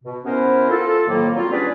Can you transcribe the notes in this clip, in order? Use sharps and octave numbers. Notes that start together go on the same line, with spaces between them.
B2
C3 B3 C#4 E4 A#4 C5
F4 A4
F2 A2 D#3 F#3 A#3
F#3 G3 C4 F4
G3 C#4 D4 G#4 B4 D5